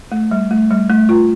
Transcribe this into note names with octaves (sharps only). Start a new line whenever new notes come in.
A3
G3
A3
G3
A3
F4